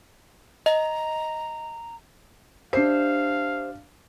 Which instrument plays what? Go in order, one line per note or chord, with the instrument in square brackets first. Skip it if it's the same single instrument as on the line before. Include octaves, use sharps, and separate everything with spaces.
[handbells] D#5 [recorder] A#5
[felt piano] D4 C7 [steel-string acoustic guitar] G4 C5 E5 [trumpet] F5